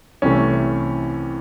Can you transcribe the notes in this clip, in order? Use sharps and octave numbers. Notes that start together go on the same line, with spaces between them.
C2 C3 E3 A3 C#4